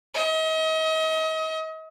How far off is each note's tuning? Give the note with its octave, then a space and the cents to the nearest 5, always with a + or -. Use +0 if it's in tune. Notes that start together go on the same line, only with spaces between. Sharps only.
D#5 +35